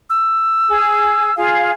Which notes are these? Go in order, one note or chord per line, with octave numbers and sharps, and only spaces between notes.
E6
G#4
F4 G#4 F5